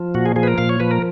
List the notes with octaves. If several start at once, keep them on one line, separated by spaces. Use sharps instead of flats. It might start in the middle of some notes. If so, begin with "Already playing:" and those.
Already playing: F3
A#2 F#4
G#4
F3 G#4
B4
A#4
A#2 F5
C#5
F3 B4
A#4